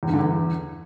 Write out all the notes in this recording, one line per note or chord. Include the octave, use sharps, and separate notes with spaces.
E2
G2
D3
E2